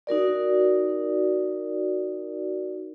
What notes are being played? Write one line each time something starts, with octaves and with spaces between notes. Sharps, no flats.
D#4 F#4 A#4 D5